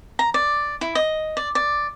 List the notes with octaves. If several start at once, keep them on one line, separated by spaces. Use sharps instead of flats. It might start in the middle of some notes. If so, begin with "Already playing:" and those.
A#5
D5
E4
D#5
D5
D5